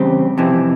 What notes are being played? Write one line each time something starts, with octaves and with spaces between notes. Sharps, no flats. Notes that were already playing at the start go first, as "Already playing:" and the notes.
Already playing: E2 C#3 G3 C4 G4
F2 C3 E3